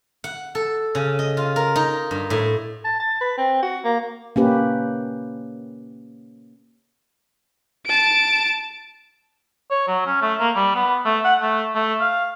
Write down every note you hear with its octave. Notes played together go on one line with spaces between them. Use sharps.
F#5
A4
C#3
D#5
F4
A#4
D#4
G2
A2
A5
A5
B4
C4
F#4
A#3
A#3 C#4 G4 B4
A5 D7
C#5
F#3
C#4
A3
A#3
G3
B3
A3
F#5
A3
A3
F5